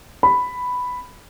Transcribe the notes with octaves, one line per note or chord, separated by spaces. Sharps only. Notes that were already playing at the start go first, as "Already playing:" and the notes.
B5